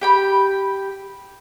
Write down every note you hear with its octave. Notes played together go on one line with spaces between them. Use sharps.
G4 G5 B5